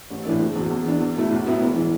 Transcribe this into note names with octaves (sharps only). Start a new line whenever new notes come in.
A1
A2 E3 A3 D4
F#1
E2 B2
E2
E3 D4
E2
B2 A3 E4
B1
A2 F#3 B3 E4
E1
E3